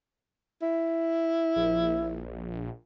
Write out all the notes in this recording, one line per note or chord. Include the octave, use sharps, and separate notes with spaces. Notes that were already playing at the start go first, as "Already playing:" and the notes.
E4
A#1